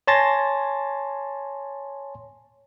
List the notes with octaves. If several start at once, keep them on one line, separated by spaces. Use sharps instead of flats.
C#5 G#5 A5 C6 A6 A#6